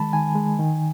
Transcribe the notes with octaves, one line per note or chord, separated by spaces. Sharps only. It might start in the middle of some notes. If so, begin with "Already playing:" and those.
Already playing: D#3 G#3 A5 B5
D#3 G#5
G#3
D#3